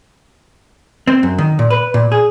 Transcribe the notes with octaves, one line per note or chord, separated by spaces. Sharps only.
C4
F#2
D#3
A#2
B4
A#2
G#4